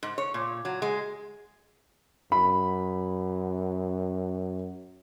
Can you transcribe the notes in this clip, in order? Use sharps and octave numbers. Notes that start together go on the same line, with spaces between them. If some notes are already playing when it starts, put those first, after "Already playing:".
G#2
C#5
A#2
F#3
G#3
F#2 B5